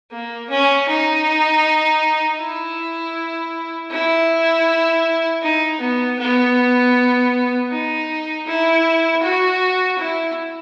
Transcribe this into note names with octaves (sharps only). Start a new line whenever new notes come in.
A#3
C#4
D#4
E4
E4
D#4
B3
B3
D#4
E4
F#4
E4